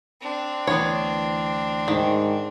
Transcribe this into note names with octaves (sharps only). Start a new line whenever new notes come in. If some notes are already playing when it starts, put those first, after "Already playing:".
C4 D4
D2 E3 B3 C#5
G#2 D#3